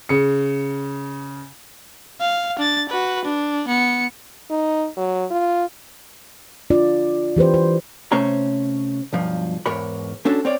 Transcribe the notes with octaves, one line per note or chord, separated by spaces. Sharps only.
C#3 C#7
F5
D4 A6
F#4 B4
D4
B3 C#7
D#4
F#3
F4
D4 F4 D5
E3 G4 B4 C5
C5
C3 A3 C#4 C5 C#5 A#5
B1 G2 F3
E2 G#2 A#4 C#5 B5
C#4 D4 F#4 A4
C4 C#5 D5